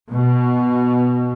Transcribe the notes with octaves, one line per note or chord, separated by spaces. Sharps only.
B2